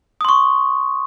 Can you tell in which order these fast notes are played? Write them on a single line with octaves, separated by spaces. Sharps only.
D#6 C6 C#6